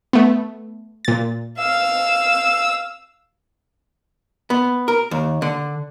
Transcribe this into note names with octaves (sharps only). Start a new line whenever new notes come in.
A3 B3
A#2 A6
F5 E6
B3
A#4
D#2
D3